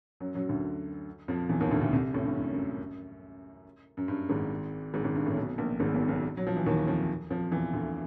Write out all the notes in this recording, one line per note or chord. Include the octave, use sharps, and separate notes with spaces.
F#2 F#3
F#2 F#3
D2 D3
F2 F3
E2 E3
D#2 D#3
D2 D3
D2 D3
C2 C3
A1 A2
G2
F#2
F#2
F#2
G2
G#1 G#2
G#1 G#2
G#1 G#2
G2
A1 A2
B1 B2
A#1 A#2
G#1 G#2
B1 B2
B1 B2
F#3
F3
E3
D#2 D#3
F2 F3
F2 F3
E2 E3
D2 D3